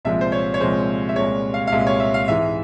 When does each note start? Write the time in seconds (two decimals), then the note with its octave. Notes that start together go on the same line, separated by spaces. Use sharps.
0.05 C2 A#2 F3 G#3 E5
0.21 C5
0.32 C#5
0.54 C#5
0.60 C2 A#2 F3 G#3 C5
1.09 E5
1.16 C2 A#2 G#3 C#5
1.54 F5
1.67 F5
1.72 C2 A#2 G#3 E5
1.87 C#5
2.00 E5
2.14 F5
2.28 G#2 E3 G#3 E5